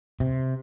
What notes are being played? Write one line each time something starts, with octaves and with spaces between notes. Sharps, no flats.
C3